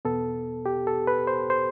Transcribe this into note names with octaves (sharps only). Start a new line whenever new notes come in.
E2 B2 B3 A4
G4
A4
B4
C5
C5